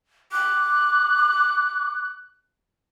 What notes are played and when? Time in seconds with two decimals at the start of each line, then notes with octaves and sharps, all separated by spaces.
0.32 D6 F#6